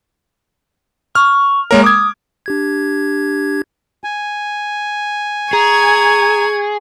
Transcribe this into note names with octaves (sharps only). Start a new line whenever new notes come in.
C#6 F6
G#3 A#3 A#4 C#5
D6 D#6 G#6
D4 G4 G#6
G#5
G#4 A#5 C#6 G#6